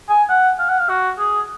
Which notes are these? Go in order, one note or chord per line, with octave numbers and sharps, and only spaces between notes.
G#5
F#5
F5
F#5
F5
F#4
G#4